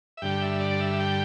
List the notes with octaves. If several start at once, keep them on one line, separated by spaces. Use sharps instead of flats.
E5
G2 D3 G3 G5
E5
D5
E5
G5